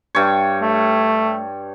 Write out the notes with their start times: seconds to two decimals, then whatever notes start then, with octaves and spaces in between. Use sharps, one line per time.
0.15 G2 C#5
0.62 A3